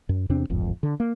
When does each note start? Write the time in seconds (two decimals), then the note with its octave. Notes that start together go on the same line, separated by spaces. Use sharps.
0.09 F#2
0.29 E2 C3 C4 D4
0.50 D1 G#1 F2
0.83 D3
1.00 A#3